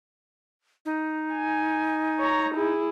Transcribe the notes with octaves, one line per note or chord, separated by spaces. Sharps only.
D#4
G#5
C#5 A#5
E4 G#4